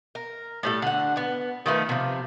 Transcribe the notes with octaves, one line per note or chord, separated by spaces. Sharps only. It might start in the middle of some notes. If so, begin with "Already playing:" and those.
A#4
A2 G3 A4
D3 F#5
B3
D#3 F3 A3 B3
C3 F3